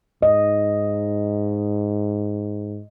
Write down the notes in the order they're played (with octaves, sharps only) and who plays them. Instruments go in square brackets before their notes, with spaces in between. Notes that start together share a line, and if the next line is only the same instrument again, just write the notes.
[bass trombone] G#2 [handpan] D#5